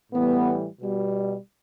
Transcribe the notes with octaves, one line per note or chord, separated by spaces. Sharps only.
A2 E3 G3 B3
B2 G3